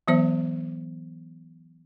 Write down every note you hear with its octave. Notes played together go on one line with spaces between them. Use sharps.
E3 F#3 B3 C5 E5